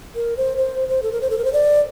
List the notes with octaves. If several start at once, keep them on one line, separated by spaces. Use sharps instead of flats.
A#4
C5
C5
C5
A4
A#4
C5
A4
A#4
C5
D5